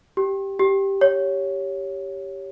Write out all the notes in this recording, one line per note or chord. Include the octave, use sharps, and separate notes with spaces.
G4
G4
C#5